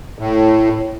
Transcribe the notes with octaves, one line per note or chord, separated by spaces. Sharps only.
A2